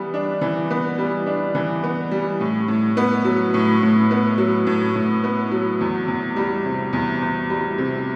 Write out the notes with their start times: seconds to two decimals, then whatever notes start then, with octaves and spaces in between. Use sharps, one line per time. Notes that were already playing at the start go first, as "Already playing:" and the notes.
Already playing: E3 G3 B3
0.14 D4
0.41 E3
0.70 B3
0.98 G3
1.27 D4
1.55 E3
1.83 B3
2.11 G3
2.41 A2
2.68 A2
2.97 B3
3.25 F#3
3.54 A2
3.82 A2
4.11 B3
4.38 F#3
4.67 A2
4.95 A2
5.24 B3
5.51 F#3
5.81 E2
6.08 E2
6.36 G3
6.65 C3
6.93 E2
7.22 E2
7.50 G3
7.78 C3